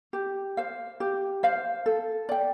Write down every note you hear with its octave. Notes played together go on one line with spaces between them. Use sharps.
G4
C5 F5
G4
C5 F5
A4
D5 G5